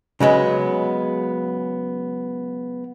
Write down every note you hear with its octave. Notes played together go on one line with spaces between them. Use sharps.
C#3 F#3 G#3 B3